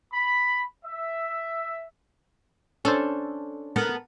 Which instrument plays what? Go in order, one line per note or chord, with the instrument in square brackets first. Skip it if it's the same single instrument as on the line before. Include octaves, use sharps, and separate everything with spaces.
[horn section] B5
E5
[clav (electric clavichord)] C#4 D4 C5 [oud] A4
[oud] B3 A4 A#4